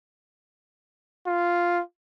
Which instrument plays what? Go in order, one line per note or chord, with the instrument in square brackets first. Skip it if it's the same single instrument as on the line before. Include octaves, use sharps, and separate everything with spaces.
[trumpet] F4